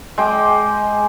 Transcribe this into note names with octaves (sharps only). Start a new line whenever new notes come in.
G#3 G5 D6